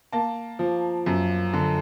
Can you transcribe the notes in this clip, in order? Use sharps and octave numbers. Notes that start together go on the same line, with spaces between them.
A#3 A5
F3
F#2
D3